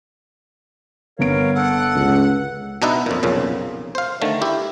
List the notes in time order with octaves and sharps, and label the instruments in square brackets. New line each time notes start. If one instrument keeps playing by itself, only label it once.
[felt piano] G1 B3 D7 [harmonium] A#4 C#5 F5
[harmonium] A4 [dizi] F#5
[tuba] C#2
[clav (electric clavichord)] B2 D4 D#4 B4 E5
F2 A#2
B1 F2 A#2 C#3
C5 F5
D3 D#3 A3
E4 G4